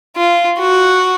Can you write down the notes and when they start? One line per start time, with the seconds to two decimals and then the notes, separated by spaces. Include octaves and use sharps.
0.17 F4
0.59 F#4